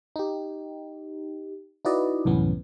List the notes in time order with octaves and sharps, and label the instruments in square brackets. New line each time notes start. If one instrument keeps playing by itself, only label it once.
[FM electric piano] D#4 G4
D#4 E4 F#4 B4 D5 D#5
C2 F#2 A2 E3 B3 C#4